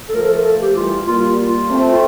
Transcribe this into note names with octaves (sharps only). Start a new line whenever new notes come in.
A4
F3 A3 A#4
A4
A#4
A4
G4
E3 G3 F4
G3 A#3 F4
F4
F4
A3 C4
F4